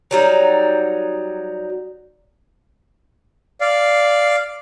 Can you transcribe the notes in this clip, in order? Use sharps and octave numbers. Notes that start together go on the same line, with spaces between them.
F#3 G3 D#4
D5 F5